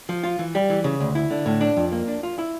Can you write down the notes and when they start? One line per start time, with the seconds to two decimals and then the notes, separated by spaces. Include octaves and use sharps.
0.09 F3
0.23 F4
0.39 E3
0.55 G3
0.70 E3
0.84 C#3
1.00 D2
1.15 E4
1.31 D3
1.46 A2
1.61 D4
1.77 F2
1.92 A#3
2.08 D4
2.23 F4
2.38 E4